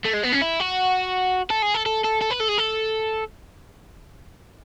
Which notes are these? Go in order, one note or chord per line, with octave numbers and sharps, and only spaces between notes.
A3
G#3
B3
C#4
E4
F#4
A4
G#4
A4
A4
A4
A4
B4
A4
G#4
A4